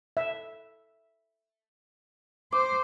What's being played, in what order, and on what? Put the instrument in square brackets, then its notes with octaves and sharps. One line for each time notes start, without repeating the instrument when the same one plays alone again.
[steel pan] E5
[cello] C5 [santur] D6